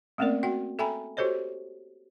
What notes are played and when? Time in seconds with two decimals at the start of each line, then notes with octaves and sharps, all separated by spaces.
0.18 A3 A#3 C4 C#4 A#4 D5
0.43 F#4 F#5 G5
0.79 A4 E5 G5 G#5 A#5 B5
1.17 F#4 G4 A4 C5 C#5 D#5